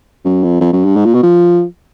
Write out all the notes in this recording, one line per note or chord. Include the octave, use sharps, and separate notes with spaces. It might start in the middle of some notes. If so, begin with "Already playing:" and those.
F#2
F2
F2
F#2
G2
G#2
A#2
B2
F3